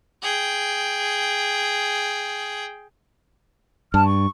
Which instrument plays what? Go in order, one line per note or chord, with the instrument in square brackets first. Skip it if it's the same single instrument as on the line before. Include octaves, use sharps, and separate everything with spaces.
[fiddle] G#4 G5
[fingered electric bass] G2 [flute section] A5 F6
[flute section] C#6